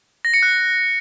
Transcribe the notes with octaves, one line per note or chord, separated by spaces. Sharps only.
A#6
C#7
F#6